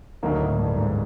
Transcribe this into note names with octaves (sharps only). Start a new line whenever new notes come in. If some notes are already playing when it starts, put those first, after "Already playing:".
D2 D3 D#3 F#3 A#3 D#4
A2
G2
G#2